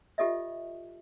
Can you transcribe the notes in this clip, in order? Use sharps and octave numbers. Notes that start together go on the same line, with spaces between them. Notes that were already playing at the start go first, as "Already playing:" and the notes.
F4 G4 A4 D#5 E5